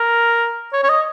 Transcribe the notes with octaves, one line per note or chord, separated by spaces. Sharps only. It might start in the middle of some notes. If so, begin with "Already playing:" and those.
Already playing: A#4
C#5
C#5
D#5